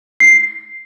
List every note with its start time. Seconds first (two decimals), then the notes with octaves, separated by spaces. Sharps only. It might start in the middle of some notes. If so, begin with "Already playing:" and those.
0.20 C7